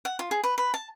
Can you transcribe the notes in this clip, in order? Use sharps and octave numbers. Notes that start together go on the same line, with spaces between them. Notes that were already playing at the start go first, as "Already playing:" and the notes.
F#5
F4
G#4
B4
B4
A5